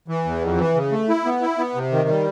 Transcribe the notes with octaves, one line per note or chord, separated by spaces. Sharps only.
E3
E2
F2
E3
C#3
A3
E4
B3
E4
B3
C3
D#3
G3